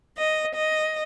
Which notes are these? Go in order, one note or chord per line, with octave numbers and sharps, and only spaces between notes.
D#5
D#5